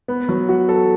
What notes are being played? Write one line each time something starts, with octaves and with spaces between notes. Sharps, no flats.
B3
F#3
F#4
A4